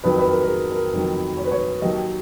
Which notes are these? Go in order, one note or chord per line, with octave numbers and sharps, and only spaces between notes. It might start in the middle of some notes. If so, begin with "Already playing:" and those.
F2 D#3 F#3 B4
B4
A#4
A#4
G#4
A#4
F2 D#3 F#3
C#5
B4
C#5
D#2 D#3 F#3 D#5